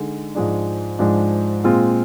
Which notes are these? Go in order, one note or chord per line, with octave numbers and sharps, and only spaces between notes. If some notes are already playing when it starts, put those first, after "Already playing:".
Already playing: D3 G#3 D#4
G#2 F3 G#3 D4
G#2 F3 G#3 D4
A#2 G#3 C4 F4